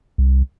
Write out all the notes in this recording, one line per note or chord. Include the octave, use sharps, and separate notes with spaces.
C2